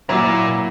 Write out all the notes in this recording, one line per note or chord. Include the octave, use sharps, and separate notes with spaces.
A#2 F#3 A#3 E4